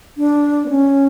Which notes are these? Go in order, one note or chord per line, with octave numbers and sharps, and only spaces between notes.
D4
B3
C#4